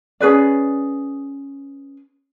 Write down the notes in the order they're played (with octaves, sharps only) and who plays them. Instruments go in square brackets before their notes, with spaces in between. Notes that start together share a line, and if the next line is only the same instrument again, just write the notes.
[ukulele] C#4 G#4 B4 D5